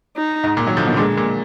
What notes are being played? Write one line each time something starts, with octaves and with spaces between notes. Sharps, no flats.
D#4
G#2
A#2
D#3 F#3
D3 F3
B2 D#3
A#2 D3 G#3
A#2